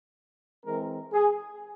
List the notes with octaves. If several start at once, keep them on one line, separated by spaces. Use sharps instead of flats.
E3 G#3 C4 A#4
G#4